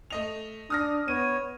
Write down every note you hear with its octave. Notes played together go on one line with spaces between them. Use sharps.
A3 D#5 F7
D4 D#6 F6 A#6
B3 C#5 D#7